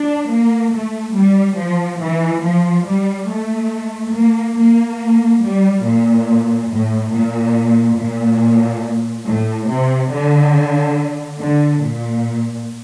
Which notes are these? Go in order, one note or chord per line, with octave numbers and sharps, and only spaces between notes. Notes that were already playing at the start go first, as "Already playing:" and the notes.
Already playing: D4
A#3
A3
G3
F3
E3
F3
G3
A3
A#3
A#3
G3
A#2
A2
A#2
A#2
A2
C3
D3
D3
A#2